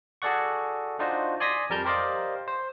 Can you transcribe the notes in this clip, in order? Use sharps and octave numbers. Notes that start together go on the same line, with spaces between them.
F#4 G#4 A4 D5 F#5 C#6
D4 D#4 F4 F#4 C5
D5 G#5 C6 D#6 A#6 B6
F2 G3 A#4 A5 F6 G6
G4 A#4 C5 D5 D#5 F5
C5